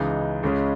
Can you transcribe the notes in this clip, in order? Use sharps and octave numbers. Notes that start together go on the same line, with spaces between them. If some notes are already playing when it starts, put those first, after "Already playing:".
Already playing: C#2 C#3 E3 G#3 D#4
C#2 C#3 G#3 C#4